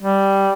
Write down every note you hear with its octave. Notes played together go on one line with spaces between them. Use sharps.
G3